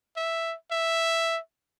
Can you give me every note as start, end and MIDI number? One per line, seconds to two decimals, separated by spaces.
0.17 0.56 76
0.71 1.40 76